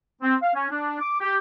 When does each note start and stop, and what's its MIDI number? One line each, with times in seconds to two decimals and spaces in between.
0.22 0.35 60
0.42 0.52 77
0.55 0.70 61
0.70 1.00 62
1.00 1.16 86
1.20 1.37 67